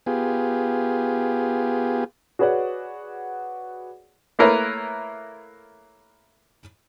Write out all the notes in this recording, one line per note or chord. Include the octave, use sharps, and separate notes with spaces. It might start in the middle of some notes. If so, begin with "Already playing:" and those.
B3 F4 G4 G#4
F#4 G#4 B4 C#5 D5 F#5
A3 A#3 E4 A#4 B4 C#5